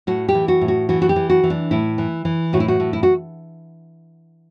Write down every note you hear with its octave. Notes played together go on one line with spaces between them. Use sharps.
A2 F#4
G4
E3
F#4
A2
F#4
E3 F#4
F#4
G4
E3
F#4
E3
D4
A2 E4
E3
E3
A2 F#4
E4
F#4
A2
E4
F#4